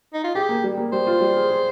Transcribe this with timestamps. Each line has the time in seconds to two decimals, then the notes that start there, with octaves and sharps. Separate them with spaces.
0.14 D#4
0.24 F4
0.35 G4 G#4
0.49 A#3
0.64 G3
0.78 A#3
0.93 G3 C5
1.07 F4
1.21 G3
1.36 G#4
1.50 G#4